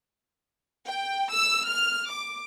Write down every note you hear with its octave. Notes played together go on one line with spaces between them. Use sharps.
G5
E6
F6
D6